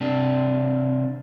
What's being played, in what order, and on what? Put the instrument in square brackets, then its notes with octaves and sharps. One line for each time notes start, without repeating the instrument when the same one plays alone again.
[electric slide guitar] C3 D4